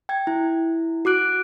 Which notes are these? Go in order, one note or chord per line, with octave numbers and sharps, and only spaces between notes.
G5 G#6
E4
F#4 D6 F#6 D7